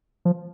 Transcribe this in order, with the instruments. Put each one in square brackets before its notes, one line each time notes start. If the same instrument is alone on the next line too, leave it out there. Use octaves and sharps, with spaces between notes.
[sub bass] F3